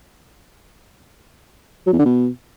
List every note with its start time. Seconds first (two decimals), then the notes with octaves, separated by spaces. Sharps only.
1.87 F#3
1.93 E2
1.99 D3
2.05 B2